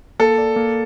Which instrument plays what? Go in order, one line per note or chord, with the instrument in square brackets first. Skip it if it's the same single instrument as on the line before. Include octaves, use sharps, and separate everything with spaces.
[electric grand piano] A#3 [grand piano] A4
[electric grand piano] D5
A#3